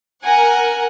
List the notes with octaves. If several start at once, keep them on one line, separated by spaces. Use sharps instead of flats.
A#4 F#5 G#5